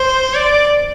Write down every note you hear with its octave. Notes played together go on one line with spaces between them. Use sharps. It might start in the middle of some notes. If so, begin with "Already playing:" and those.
Already playing: C5
D5